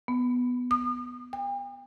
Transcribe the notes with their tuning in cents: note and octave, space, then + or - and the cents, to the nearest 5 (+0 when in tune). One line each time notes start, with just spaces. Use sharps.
B3 +5
D#6 -45
G5 +40